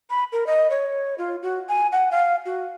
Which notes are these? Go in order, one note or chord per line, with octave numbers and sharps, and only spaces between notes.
B5
A#4
D#5
C#5
F4
F#4
G#5
F#5
F5
F#4